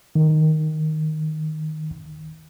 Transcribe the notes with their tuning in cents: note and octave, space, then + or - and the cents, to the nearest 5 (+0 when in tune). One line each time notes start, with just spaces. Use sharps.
D#3 +0